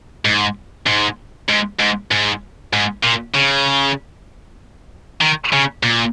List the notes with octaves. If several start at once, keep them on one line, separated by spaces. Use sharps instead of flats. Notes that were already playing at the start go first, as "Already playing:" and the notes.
G#2
G#2
G#2
G#2
G#2
G#2
A#2
C#3
D#3
C#3
A#2